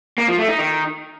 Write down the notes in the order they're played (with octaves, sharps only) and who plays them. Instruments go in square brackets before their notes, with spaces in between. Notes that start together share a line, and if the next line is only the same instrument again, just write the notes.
[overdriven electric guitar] A#3
F3
A3
D#4
D#3